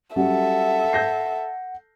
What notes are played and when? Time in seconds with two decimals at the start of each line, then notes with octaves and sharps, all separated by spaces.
0.16 F#3 G3 C#4 A4 E5 F#5
0.93 G6 A#6 C7